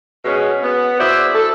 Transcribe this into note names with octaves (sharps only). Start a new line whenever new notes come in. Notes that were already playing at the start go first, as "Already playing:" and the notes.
B2 G#3 C#4
B3
E4 F#4 G#4 C5 D5
A4